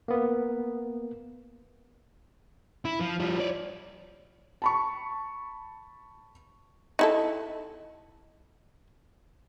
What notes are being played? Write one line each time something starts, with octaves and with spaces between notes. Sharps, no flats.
A#3 B3
E4
F3
F3 G3
C#5 D5
A5 B5 C#6
D#4 E4 A4